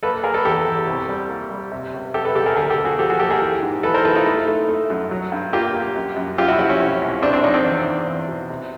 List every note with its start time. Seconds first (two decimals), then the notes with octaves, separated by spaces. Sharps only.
0.03 A#3 A4 B4
0.23 A#3 G#4 A#4
0.34 A4 B4
0.45 E2 G4 A4
0.66 E2
0.87 C2
1.09 G3
1.30 A#3
1.51 G3
1.72 C3
1.94 C#2
2.14 C3 G4 A4
2.25 A4 B4
2.35 C#2 G4 A4
2.46 G#4 A#4
2.57 D2 G#4 A#4
2.70 G4 A4
2.78 D3
2.85 F#4 G#4
2.99 F3 G4 A4
3.10 F#4 G#4
3.20 A#3 G4 A4
3.30 G#4 A#4
3.42 E3
3.63 G#2
3.83 E3 A4 B4
3.94 A#4 C5
4.04 E3 A4 B4
4.15 D#4 F4
4.26 A3
4.47 A3
4.69 A3
4.90 F#2
5.11 F#3
5.32 G2
5.53 A#3 F4 G4
5.74 A#3
5.95 F#2
6.16 F#2
6.38 F#2 F4 G4
6.48 E4 F#4
6.59 F3 E4 F#4
6.69 C#4
6.79 C3 C#4
7.02 C2
7.22 C2 C4 D4
7.33 C4 D4
7.44 F3 C#4 D#4
7.54 C4 D4
7.65 E2
7.86 E2
8.07 E2
8.28 B2
8.50 C3